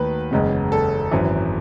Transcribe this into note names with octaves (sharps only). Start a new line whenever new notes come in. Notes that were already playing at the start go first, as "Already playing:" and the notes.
Already playing: D#2 D#3 F#3 A3 B4
F#1 E2 C#3 G#3 B3
A4
G#1 F#2 E3